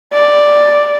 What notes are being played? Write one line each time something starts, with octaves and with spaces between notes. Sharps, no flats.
D5